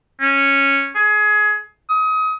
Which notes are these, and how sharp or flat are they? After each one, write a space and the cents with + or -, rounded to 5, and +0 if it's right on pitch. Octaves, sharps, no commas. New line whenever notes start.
C#4 -5
G#4 +25
D#6 +30